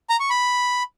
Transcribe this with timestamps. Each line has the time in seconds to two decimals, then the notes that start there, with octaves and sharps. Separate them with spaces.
0.10 A#5
0.20 C#6
0.30 B5